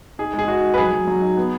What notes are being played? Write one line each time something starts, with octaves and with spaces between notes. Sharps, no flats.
D#4 G#4
G#3
G#4
D#4 F#4
G#3
B4
F#3 G#4
F#3
F#3
D#4
B3